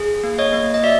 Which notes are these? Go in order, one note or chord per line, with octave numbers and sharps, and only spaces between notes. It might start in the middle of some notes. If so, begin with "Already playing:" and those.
Already playing: G#4
A#3
C#5 D#5
A#3
D#5
F#4 D5 E5